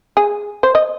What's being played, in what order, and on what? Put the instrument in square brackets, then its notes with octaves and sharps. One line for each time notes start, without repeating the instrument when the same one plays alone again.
[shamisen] G#4
C5
D#5